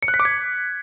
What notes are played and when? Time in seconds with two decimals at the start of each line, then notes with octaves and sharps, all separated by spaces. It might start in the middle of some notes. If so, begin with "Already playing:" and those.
0.03 C#7
0.08 F#6
0.14 B6
0.20 D6
0.25 G#6